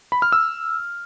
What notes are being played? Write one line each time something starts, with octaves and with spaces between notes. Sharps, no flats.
B5
F6
E6